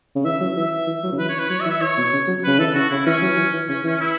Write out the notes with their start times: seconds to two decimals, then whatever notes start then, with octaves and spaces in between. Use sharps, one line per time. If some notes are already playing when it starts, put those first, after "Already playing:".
0.15 C#3
0.25 E3 E5
0.40 F#3
0.56 E3 E5
0.87 E3
1.03 F#3
1.12 C#3
1.19 E3 B4
1.29 C#5
1.39 B4
1.50 F#3 C#5
1.60 E5
1.66 E3
1.70 E5
1.81 E3 C#5
1.97 B2
2.13 C#3
2.27 F#3
2.44 C#3 B4
2.59 E3 A4
2.74 C#3 F#4
2.90 C#3 E4
3.06 E3 C#4
3.22 F#3
3.37 E3
3.53 E3
3.68 C#3 C#4
3.84 E3 C#4
3.95 C#4
4.00 E4